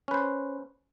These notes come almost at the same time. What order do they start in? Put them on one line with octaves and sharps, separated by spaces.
C#4 B4 C5